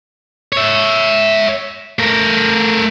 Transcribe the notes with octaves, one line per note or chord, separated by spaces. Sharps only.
C#5 E5
A3 A#4